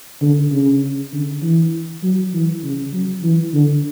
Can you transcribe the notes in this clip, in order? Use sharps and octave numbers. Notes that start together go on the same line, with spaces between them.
D3
C#3
D3
E3
F#3
E3
C#3
F#3
E3
D3